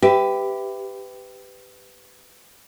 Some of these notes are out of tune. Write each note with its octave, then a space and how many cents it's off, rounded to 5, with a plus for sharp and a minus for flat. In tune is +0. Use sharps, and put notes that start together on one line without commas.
G4 +0 B4 +20 E5 +0